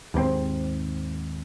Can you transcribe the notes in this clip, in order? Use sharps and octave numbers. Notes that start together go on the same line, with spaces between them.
D#2 G#2 A#3 C4